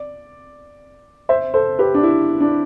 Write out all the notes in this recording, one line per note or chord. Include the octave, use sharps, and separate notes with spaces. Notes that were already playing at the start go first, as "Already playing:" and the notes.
Already playing: D5
C5 E5
A4 C5
G4 B4
D4
E4
D4